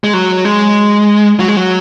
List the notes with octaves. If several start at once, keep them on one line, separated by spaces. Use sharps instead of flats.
G#3
F#3
G#3
F#3
G#3
F#3